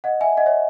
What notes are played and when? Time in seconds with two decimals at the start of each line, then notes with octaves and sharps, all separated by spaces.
0.04 D#5 F#5
0.21 E5 G#5
0.37 D#5 F#5
0.46 C#5 E5